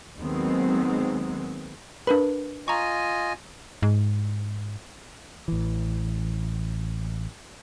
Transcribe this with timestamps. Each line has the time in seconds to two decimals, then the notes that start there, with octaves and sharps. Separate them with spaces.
0.18 D#2 D#3 F#3 G#3 B3 C4
2.07 D4 A#4 B4 B5
2.68 F4 D#5 G#5 A#5 C#6
3.82 G#2
5.48 A1 E3